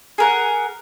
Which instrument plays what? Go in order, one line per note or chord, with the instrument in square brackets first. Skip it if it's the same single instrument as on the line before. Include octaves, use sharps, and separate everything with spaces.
[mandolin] G#4 A#4 F#5